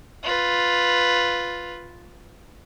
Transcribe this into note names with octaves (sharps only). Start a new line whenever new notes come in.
F4 B4